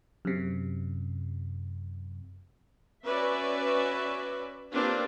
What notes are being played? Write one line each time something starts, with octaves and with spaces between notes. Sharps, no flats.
F#2 C3
C#4 F#4 B4 D5 E5
A#3 C4 D4 F4 G4 B4